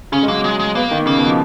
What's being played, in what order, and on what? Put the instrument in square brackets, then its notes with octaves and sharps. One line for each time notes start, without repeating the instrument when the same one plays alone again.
[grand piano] C#3 [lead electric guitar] C#4
[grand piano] G#3
[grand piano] F#3 [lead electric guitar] A#3
[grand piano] F#3 [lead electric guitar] G#3
[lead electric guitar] G#3
[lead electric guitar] A#3 [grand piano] B3
[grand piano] D#3
[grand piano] C#3 [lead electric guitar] A#3
[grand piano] B2
F3